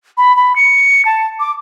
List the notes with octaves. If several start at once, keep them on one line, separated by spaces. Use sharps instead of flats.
B5
B5
C#7
A5
D6